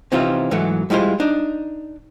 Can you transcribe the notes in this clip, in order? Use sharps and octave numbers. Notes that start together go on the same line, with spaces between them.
C3 E3 C4 C#4 D#4 F4
G#2 E3 F#3 A3
G3 G#3 E4 F4 C5
D4 D#4